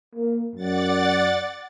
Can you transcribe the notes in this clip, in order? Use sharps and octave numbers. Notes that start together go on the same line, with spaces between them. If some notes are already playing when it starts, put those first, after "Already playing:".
A#3
F#2 D5 F#5 A6